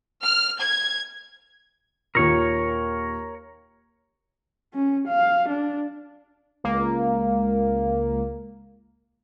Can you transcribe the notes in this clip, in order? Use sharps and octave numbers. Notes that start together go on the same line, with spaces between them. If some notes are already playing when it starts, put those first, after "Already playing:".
F6
G#6
D#2 A#2 A#4 C#5
C#4
F5
D4
C#2 A#3